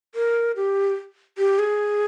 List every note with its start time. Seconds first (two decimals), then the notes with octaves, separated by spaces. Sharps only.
0.15 A#4
0.56 G4
1.38 G4
1.59 G#4